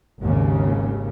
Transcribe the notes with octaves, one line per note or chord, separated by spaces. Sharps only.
G#1 D#2 C#3